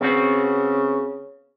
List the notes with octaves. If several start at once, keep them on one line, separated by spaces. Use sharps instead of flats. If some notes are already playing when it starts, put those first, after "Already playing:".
C#3 B3 C4 F#4